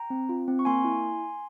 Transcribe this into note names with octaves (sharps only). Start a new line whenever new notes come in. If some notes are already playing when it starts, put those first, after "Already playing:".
Already playing: G5 A#5
C4
F4
C4
C#6
A#3 G#5 C6
E4